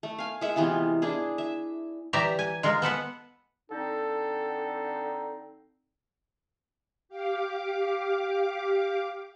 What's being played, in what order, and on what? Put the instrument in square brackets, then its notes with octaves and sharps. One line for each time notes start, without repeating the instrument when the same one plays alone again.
[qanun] A3
F5 G#5
G#3 E5 F#5
C3 E3 B3 F4
D4 E4 G#4
E5
[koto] E3 G4 D5 E5 A#5
G#5
G#3 F4 A#4
B3 A4 B4 F#5
[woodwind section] D3 C4 D#4 [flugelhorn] A4
[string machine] G4 F5 D6